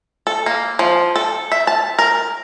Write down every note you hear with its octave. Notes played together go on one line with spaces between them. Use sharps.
A4
A#3
F3
A4
E5
A5
A#4